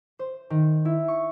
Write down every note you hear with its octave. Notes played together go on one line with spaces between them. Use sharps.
C5
D#3
E4
C#6